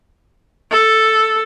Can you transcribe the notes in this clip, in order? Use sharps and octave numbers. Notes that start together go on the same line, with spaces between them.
A4